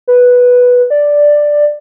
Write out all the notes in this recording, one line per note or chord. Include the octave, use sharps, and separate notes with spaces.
B4
D5